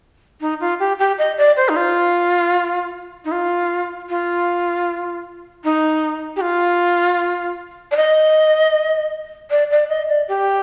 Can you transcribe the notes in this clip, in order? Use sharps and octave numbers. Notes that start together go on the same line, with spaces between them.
D#4
F4
G4
G4
D#5
D5
C5
D#4
F4
D#4
F4
F4
D#4
G4
F4
D5
D#5
D5
D5
D#5
D5
G4